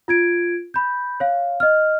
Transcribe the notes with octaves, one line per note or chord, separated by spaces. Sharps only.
F4 G#6 D7
B5 G6
C#5 F5
D#5 F6